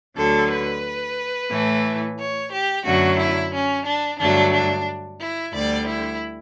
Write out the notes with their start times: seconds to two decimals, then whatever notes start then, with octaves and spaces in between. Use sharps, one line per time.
0.16 D2 D3 F#3 A4
0.50 B4
1.51 A2 E3 A3
2.18 C#5
2.52 G4
2.85 F#2 D3 F#3 A3 F#4
3.19 E4
3.53 C#4
3.86 D4
4.19 G2 D3 F#3 A3 D4
4.53 D4
5.21 E4
5.54 D2 D3 G3 D5
5.87 E4